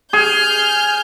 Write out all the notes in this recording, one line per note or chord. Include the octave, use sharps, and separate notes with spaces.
G#4 F6 G6